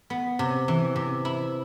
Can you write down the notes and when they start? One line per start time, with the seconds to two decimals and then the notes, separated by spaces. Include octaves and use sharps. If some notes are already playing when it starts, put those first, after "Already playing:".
0.10 B3
0.39 C3
0.68 E3
0.96 C3
1.25 E4